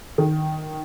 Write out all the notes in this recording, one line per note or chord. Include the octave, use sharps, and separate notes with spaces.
D#3